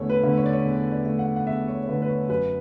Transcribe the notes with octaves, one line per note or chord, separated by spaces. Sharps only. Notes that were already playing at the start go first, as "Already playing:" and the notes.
Already playing: E2 D3 A3 C#5
B4
D3 A3
C#5
D5
C#5
E2
D5
D3 A3
F#5
F#5
E2 E5
C#5
C#5
D3 A3 B4
B4
C#5
F#2 B4